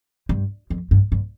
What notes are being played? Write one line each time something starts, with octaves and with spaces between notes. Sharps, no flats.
G2
F2
G2
G2